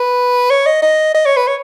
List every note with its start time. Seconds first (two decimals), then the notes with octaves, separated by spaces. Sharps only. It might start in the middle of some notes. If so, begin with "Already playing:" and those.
Already playing: B4
0.50 C#5
0.66 D#5
0.82 D#5
1.14 D#5
1.26 C#5
1.36 B4
1.47 C#5